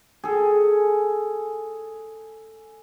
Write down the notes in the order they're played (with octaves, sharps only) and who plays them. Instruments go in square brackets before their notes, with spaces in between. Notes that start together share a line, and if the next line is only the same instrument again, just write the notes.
[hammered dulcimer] G#4 A4